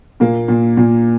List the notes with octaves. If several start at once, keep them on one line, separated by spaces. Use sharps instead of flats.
A#2 A#3
A#2
A#2